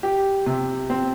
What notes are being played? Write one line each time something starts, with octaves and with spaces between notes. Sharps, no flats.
G4
C3
C4